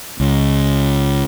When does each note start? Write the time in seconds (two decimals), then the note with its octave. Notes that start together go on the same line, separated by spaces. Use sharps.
0.20 C#2